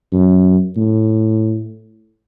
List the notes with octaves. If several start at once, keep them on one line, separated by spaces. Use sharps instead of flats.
F#2
A2